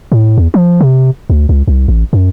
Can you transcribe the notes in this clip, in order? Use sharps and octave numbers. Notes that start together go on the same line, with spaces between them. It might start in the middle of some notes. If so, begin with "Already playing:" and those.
A2
E2
F3
C3
D2
C#2
C2
A1
F#2